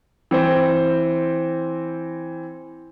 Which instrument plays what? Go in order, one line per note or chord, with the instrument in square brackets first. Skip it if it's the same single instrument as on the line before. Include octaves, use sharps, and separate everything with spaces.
[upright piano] E3 C4 C5